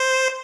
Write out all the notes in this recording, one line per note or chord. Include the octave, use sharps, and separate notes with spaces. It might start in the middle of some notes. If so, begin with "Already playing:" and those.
Already playing: C5